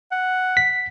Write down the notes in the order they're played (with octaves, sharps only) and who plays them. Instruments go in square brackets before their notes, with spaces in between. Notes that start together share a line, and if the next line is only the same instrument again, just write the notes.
[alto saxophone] F#5
[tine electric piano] B6